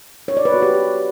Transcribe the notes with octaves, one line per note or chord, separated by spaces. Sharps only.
C#5
D5
B4
F#4
G4